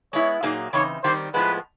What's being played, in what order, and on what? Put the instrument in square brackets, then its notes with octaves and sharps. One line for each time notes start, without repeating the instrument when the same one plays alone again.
[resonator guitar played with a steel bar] G#3 B3 E4 [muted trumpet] C#5
[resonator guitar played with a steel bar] A#2 F#3 A#3 D#4 G#4
[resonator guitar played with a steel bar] C#3 E3 C4 D#4 [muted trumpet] C#5
[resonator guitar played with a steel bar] D#3 G3 C4 D#4 [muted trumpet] C5
[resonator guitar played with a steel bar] A2 F3 G#3 B3 [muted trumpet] B4